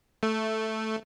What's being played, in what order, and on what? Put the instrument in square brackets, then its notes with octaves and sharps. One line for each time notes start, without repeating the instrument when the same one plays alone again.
[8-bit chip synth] A3